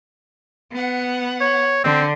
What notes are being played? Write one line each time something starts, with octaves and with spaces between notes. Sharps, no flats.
B3 F#5
C#5
D3 C4